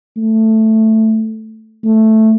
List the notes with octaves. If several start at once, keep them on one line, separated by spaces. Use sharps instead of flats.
A3
A3